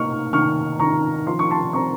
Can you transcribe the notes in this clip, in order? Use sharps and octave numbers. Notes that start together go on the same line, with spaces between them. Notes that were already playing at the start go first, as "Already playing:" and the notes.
Already playing: A#3 D#4 C#6 F6
D#3 C#6 F6
D#3 A#5 C#6
F3 C6
C#6
A5 C6
C4 A#5 C#6